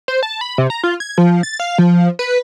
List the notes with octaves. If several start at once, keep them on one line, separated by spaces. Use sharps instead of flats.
C5
A5
B5
C3
A#5
F4
G#6
F3
A6
F5
F3
B4